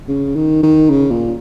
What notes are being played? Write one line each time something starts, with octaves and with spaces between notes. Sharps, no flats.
C#3
D#3
D#3
C#3
A#2